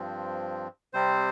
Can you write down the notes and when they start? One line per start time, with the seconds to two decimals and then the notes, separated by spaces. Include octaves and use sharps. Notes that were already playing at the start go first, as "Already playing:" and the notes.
Already playing: G2 F3 C4
0.93 C3 G3 C4 C5